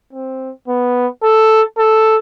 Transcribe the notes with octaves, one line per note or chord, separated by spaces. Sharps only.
C4
B3
A4
A4